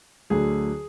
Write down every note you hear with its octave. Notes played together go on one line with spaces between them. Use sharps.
D2 D3 F#3 G#4